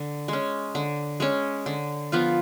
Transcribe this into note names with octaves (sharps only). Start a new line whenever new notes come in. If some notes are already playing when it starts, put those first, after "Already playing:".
Already playing: D3
G#3 C#4
D3
G#3 C#4
D3
F3 B3 F4